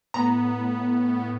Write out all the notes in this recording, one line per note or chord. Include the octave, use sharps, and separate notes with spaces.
A2 B3 A#5